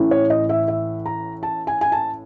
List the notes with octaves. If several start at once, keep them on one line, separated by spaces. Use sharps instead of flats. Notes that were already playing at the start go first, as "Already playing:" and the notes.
Already playing: A1 A2 E3
C#5
D#5
E5
E5
A#5
A5
G#5
G#5
A5